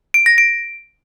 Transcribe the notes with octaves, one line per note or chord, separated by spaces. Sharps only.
D7
A#6
D7